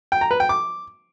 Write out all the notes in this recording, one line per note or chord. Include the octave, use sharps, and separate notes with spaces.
G5
A#5
B4
G5
D6